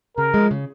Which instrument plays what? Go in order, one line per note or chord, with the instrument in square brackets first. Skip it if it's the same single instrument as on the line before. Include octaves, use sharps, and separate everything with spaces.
[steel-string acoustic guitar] C#3 [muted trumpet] A#4
[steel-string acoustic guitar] F3 G#3
C#3